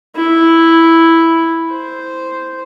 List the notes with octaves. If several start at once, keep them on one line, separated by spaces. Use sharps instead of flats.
E4
C5